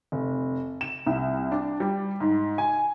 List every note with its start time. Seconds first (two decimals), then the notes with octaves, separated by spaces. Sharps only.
0.12 F1
0.81 E7
1.06 C2
1.52 D4
1.80 G3
2.20 G#2
2.58 G#5